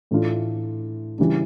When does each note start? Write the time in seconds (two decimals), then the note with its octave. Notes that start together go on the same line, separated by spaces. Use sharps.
0.11 A2 E3 A3 D4 F4
1.18 C#3 E3 G3 D4